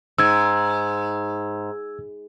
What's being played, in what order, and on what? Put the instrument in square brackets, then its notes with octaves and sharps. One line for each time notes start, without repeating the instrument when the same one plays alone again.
[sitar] G#2 [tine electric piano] E6 G#6